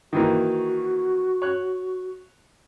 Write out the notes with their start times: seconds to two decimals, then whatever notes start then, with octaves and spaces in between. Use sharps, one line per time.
0.13 D#3 E3 A#3 F#4
1.42 C#5 F#6